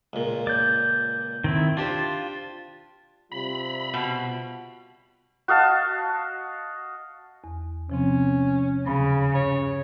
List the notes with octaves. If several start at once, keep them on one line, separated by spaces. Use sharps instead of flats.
C#2 A#2
D5 G6
D#3 C4 E4
D4 F4 G4 C5
C3 G3 F4 B5
B2
F#4 D#5 F5 A5
E2
C3 F3 C4 C#4
D#2 C#3 B5
G2 C#4 C#5